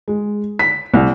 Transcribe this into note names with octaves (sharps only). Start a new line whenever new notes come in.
G#3
B6
C2